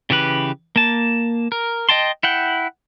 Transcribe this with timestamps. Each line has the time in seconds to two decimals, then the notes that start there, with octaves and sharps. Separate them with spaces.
0.10 C#3 E3 G4 B4
0.76 A#3 A5
1.52 A#4
1.89 D#5 G5 A5 C6
2.23 E4 F#5 G5